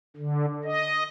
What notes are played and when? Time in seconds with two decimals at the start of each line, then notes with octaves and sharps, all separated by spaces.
0.17 D3
0.64 D#5